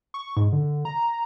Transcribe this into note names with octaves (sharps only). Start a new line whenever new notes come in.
C#6
G#2
D3
A#5